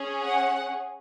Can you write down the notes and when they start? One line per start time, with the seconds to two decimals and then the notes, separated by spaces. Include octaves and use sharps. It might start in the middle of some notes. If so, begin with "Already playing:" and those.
Already playing: C#4 G#4
0.24 F#5